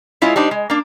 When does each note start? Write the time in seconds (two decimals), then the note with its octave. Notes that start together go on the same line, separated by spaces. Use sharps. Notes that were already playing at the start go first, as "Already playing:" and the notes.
0.22 G#3 E4 F4 G#4 C#5
0.36 G3 D4 D#4 C5
0.51 G#3
0.70 A#3 D4